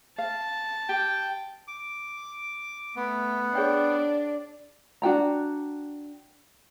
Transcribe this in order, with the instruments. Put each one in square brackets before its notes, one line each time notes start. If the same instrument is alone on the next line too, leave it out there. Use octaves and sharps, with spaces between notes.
[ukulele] F5 [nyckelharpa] A5
[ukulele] G4 [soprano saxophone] G5
[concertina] D6
[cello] A3 [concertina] B3
[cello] D4 [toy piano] G#4 C#5 G5 [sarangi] D5
[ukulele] D4 F#4 G5 A#5